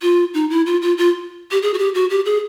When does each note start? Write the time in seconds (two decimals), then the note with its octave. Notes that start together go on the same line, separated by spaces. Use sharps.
0.02 F4
0.34 D#4
0.50 E4
0.66 F4
0.82 F4
0.98 F4
1.51 G4
1.62 G#4
1.74 F#4
1.79 G4
1.94 F#4
2.10 G4
2.25 G#4